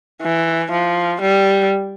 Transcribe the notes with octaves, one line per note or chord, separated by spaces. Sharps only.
E3
F3
G3